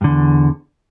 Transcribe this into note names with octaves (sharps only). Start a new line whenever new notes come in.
E2 G2 D3